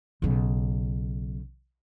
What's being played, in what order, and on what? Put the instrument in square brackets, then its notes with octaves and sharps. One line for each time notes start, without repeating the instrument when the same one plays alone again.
[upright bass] B1 C#3